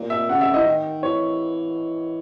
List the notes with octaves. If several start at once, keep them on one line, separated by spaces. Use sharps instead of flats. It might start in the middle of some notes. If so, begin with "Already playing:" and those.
Already playing: A#2
E5
C#3 F#5
E5
E3 D#5
D#3
E3 C#5